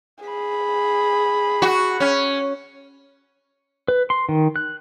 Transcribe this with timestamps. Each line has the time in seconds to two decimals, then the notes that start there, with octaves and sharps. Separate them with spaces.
0.25 G#4 B5
1.62 F#4
2.00 C#4
3.88 B4
4.10 C6
4.29 D#3
4.56 F#6